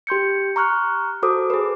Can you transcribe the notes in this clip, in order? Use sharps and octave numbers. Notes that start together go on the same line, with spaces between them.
G4 C6 G6 C#7
A#5 C#6 F6 F#6
F#4 A4 C5 D6 D#6
G#4 B4